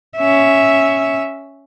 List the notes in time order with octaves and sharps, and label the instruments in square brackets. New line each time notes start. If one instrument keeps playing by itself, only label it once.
[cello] C#4 E5